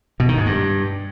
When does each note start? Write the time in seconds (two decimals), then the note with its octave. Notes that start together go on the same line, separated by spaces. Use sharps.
0.20 B2
0.29 D#3
0.37 G#2
0.46 G2